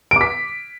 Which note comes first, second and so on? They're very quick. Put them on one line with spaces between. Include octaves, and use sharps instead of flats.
D7 D6 B6